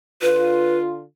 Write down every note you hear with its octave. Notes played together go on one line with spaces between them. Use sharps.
D3 F4 B4